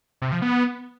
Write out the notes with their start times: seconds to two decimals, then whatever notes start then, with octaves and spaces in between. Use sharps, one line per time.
0.22 C3
0.32 F3
0.42 B3